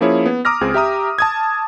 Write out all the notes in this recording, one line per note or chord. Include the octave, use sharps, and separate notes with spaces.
F3 A#3 C#4 E4 G#4 C#5
B3
A#5 D6 D#6 F6 A#6
C#2 C4 G#4
G4 E5 A#5 D#6
A5 D#6 G#6